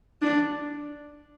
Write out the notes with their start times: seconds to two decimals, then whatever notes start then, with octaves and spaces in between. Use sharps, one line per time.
0.22 D4